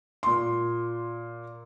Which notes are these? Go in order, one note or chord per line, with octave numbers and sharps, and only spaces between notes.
A#2 C6